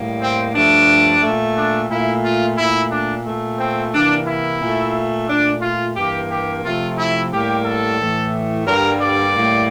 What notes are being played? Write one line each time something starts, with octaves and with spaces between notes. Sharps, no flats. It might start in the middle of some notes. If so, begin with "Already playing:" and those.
Already playing: A2 G3 A#3
C4
G2 F3 A3 D4
A#2 A3
D4
A#2 A3 E4
F4
A#2 A3 E4
D4
A#2 A3
C4
C3 E3 A#3 D4
E4
A#2 A3
A#2 A3 D4
F4
G2 E3 A#3 G4
G4
C3 F3 A3 F4
E4
A2 G3 A#3 G4
A4
A2 E3 A3
G2 D3 G3 A#3 A#4
D5
A2 G3 A#3